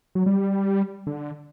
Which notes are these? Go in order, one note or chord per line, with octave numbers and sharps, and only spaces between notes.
F#3
G3
D3